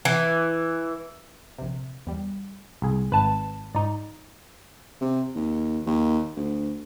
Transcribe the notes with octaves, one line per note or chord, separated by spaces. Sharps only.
E3
A#1 C3
E2 G3
C2 G#4
G#1 B4 A5
G#2 D#4 D5
C3
D#2
D#2
D2